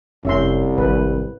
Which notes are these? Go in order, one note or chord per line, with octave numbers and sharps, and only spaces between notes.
F1 C2 C#4 E5 C6
G#1 G3 B4